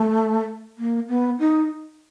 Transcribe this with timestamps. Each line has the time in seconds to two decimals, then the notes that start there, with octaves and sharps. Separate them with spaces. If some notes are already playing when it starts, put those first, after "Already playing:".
Already playing: A3
0.78 A#3
1.09 B3
1.39 D#4